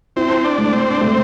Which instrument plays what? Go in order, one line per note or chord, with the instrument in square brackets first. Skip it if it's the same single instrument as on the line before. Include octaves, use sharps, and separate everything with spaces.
[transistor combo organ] C4 [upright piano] E4
[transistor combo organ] D4
[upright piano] A3
[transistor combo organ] C4
D4
[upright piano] A3 [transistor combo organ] C4